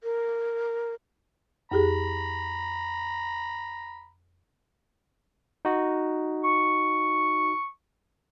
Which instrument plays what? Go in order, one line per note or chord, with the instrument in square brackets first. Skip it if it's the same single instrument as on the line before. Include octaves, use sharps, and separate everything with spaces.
[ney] A#4
[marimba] F2 G4 G#4 [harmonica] A#5 B5
[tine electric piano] D#4 F#4
[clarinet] C#6